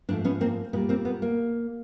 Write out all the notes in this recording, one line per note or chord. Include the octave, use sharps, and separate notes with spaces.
G#2 F3 A3 C4 D4
B3 C#4
A#3 C4
A#2 G3 A#3 B3
A#3 C4
B3
A#3